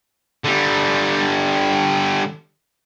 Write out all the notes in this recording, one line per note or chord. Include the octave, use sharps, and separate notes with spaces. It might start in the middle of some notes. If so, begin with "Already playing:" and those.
D3 G3